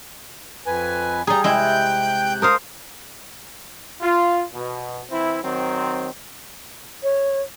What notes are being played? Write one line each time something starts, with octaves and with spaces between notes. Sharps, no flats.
F2 B4 G#5
G3 G#4 A#5
C3 G#3 E4 G5 F#6 G6
A#4 C5 F5 D#6
F4
B2
E3 C4 E4
D#3 F#3 C4
C#5